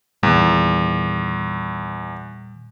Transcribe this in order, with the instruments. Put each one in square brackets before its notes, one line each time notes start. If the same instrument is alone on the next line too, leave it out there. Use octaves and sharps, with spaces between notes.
[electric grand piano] E2 [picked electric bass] A#2 D#3 G3